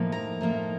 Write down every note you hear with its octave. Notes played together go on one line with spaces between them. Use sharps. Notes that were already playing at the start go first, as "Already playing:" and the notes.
Already playing: A2 F3 A#3 D#4
A#5
A2 F3 A#3 D#4